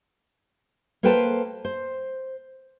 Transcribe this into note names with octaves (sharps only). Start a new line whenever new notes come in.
A#3 A4 B4 C5 G5 A5
C5